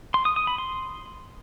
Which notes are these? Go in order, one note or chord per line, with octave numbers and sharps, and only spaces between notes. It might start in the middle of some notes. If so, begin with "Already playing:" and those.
C6
D#6
D#6
B5
C6